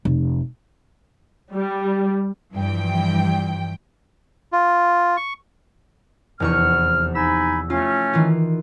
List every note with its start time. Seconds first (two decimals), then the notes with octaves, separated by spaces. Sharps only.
0.05 F1
1.54 G3
2.53 G2 E3 F3 G5
4.52 F4
5.17 C#6
6.40 F1 E2 C#6 F6
7.15 D#4 G#5 B5 E6
7.70 A3 C#4 F4
8.13 D#3 E3 F4